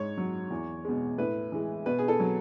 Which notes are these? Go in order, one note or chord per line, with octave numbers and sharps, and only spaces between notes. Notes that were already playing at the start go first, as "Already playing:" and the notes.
Already playing: G#2 C#5
F#3
E2
B2 G#3
A2 B4
E3 G#3
B2 B4
G#4
A4
F#3